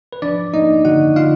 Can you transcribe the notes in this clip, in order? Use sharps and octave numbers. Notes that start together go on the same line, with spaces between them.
B4
F3 D4 D5
A#3 D#4 D#5
D3 F#4 F#5
D3 F4 F5